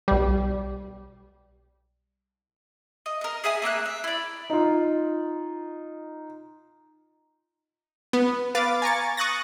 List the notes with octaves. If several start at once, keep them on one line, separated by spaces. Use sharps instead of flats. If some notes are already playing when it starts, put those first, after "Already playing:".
B1 G3
D#5
A#4 D#5
G#4 E5 G#5 D#6
A3 A#3 E5 F#6
E5
E4 D5
D#4 F4
B3
B4 F5 D6 A6
G#5 A#5 C#6 A6
C#6 D#6 F#6 A6 A#6